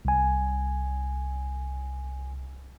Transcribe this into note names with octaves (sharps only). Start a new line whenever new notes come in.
C2 G#5